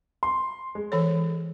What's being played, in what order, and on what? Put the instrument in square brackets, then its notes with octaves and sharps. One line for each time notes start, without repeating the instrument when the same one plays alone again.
[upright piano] C6
G#3
[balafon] E3 A4 C#5